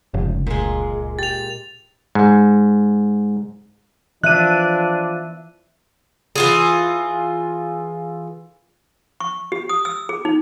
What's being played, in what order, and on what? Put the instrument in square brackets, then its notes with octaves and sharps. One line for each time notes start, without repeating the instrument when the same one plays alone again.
[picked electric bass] F1 [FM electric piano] F2 G#2 C#3
[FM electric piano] C#2 [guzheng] A#2 G#3
[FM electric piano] G4 G5 [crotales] A6 F7
[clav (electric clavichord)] G#2
[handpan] E3 E5 [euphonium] F3 [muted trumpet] D4 [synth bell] F#6 D#7
[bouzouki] E3 F4 G#4
[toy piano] C#6
G4
D#6
E6
G#4
D#4